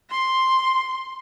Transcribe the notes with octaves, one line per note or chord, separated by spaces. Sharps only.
C6